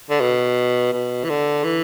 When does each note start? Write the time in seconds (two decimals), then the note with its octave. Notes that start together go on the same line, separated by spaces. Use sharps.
0.10 D3
0.21 B2
0.93 B2
1.24 E3
1.29 D3
1.64 E3